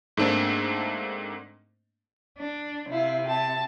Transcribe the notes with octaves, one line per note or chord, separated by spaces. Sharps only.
G#2 A3 A#3 C4 D4
D4
C3 E4 F5
G4 A5